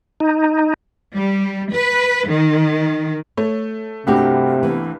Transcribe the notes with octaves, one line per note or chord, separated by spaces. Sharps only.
D#4
G3
B4
D#3
A3 C#5
C2 G2 C3 A3 F#4 G4
E3 B3